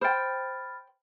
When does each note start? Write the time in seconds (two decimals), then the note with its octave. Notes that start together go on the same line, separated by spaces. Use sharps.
0.01 C5 G5 B5 F6 A6